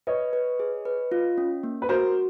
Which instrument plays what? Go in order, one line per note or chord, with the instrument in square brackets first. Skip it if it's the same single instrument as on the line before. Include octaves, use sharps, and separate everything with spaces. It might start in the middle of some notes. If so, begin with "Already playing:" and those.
[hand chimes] B4 [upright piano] C#5 D#5
[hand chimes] B4
G#4
B4
F4
C#4
A#3
[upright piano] B4
[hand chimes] F#4 [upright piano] A#4 C5